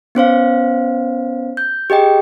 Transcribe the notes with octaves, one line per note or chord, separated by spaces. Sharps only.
B3 C#4 C5 F5
G6
G4 G#4 D#5 G5